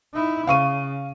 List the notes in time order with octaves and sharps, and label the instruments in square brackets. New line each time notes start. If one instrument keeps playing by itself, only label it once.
[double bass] D#4 E4
[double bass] C#3 [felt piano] F5 C#6 D#7